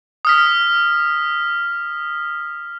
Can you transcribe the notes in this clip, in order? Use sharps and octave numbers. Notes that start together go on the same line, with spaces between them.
D#6 F6 B6